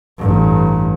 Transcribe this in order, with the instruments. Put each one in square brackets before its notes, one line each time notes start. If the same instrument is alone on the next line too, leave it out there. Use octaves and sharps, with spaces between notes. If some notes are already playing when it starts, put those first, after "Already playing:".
[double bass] A1 G2